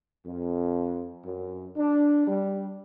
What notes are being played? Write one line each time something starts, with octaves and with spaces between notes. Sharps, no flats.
F2
F#2
D4
G3